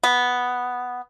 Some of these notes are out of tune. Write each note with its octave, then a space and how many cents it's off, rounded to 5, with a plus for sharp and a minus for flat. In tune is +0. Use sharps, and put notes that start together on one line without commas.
B3 +0